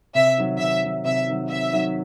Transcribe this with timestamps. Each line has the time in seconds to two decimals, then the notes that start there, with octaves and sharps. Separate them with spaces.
0.15 C3 E5
0.38 D#3 F#3
0.59 C3 E5
0.83 D#3 F#3
1.05 C3 E5
1.27 D#3 F#3
1.50 C3 E5
1.73 D#3 F#3